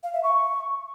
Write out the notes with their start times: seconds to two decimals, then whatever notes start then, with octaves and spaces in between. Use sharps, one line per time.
0.03 F5
0.13 E5
0.24 C#6